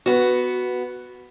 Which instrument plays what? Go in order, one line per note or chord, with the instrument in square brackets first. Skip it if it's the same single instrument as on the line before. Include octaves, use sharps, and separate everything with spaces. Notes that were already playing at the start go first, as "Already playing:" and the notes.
[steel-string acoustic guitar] B3 F#4